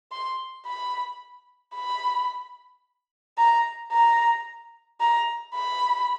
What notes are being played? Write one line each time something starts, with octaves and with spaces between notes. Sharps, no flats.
C6
B5
B5
A#5
A#5
A#5
B5